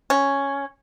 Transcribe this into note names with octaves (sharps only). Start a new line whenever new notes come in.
C#4